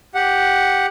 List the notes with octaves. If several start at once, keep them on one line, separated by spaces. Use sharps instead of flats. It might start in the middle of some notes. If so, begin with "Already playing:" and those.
G4 F#5